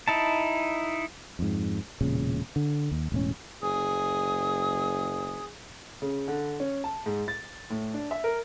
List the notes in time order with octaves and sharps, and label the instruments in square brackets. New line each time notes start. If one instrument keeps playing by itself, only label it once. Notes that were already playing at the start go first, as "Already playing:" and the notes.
[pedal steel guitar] D#4 E4 A5
[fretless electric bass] F2 G#2
E1 A#2 C#3
D3
D#2
E1 A2 F#3 C#4
[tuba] F#1 [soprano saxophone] G#4 [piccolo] D#6
[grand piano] C#3
D3
C#4
A5
G#2
A6
A2
D4
E5
A#4